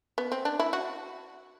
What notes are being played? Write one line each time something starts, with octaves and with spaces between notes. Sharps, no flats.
B3
C4
D4
E4
F#4